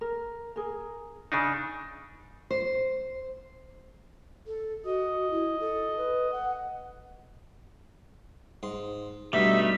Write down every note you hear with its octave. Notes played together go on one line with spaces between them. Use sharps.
A#4
G#4 A#4
C#3 D4 D#4
C5
A4
F#4 D#5
E4
A4
B4
F#5
G#2 C6
G2 B2 G3 A3 D#4 E5